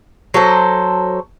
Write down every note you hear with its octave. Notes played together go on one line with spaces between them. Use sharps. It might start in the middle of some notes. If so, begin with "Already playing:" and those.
F#3 A4 C5